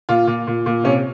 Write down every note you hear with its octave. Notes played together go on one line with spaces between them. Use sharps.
A#2 F4
A#2
A#2
A#2
C3 C#4